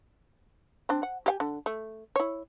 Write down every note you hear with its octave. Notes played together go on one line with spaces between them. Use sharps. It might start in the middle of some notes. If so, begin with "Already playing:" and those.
C4 D4
F#5
G4 F5 G#5
D3
A3
E4 C#5